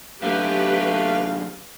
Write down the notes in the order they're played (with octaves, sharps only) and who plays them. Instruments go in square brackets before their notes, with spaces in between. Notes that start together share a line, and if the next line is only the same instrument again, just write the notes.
[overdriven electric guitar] F#2 D3 [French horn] A3 [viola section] G4 B4 [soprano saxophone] F5